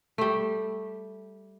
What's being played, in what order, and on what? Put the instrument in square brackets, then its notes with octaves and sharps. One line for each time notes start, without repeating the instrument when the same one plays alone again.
[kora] G3 A3